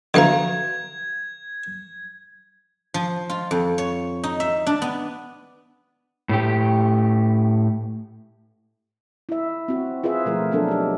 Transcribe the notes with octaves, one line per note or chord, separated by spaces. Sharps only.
D3 E3 F3 F#4 F5 A#5 G#6
F3
F4
F2
C#5
D#4
E5
D4
B3
A2 A3 G4
E4 E5
C4 F#4
F4 G#4 B4 C5 E5
B2 F3 A3 F4 A#4
F#3 B3 D4 A4 A#4
D#4 G4